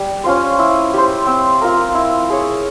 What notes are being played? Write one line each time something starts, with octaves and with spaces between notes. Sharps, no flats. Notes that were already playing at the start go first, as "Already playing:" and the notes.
Already playing: G3 G4
C#4 F4 C5
E4
G4 C5
C4
F4 A#4
E4
G#4 C#5